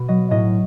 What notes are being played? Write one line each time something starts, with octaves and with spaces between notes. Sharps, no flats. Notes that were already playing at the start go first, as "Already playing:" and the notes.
Already playing: B2
F#3 D#5
A2 D#5